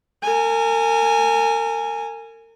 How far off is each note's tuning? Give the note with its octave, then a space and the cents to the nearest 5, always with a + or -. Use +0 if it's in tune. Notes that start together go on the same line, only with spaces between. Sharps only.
A#4 -35 G#5 +0